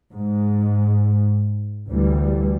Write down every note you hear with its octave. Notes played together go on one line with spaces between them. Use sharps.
G#2
D2 E3 G3